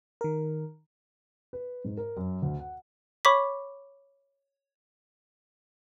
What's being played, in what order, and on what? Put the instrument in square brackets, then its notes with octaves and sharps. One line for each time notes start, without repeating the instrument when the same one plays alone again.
[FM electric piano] D#3 A#4
[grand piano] B4
G#2
A#4
F#2
D2
F#5
[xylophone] C#5 B5 C#6 D6 B6